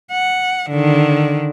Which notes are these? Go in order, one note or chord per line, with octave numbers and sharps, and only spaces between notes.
F#5
D3 D#3